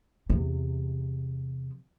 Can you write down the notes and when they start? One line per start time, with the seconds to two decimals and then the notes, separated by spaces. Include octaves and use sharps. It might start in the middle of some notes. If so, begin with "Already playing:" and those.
0.30 E2 C3